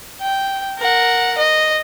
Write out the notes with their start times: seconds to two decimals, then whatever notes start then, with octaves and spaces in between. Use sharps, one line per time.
0.21 G5
0.79 A#4 F#5
1.38 D#5